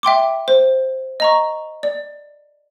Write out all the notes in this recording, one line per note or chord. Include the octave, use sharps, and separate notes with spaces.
E5 G5 C6 D6
C5
D#5 A#5 C#6
D5